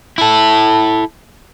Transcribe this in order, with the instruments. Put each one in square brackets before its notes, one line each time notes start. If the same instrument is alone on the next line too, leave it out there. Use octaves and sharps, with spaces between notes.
[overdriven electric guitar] E4 A4